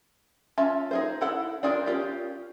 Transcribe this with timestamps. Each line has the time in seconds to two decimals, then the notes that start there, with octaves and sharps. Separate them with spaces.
0.58 C#4 F4 E5 A5
0.91 D#4 G#4 C5
1.21 E4 A4 F#5
1.63 D4 F4 G#4 A#4 C5
1.86 C#4 D#4 F4 G4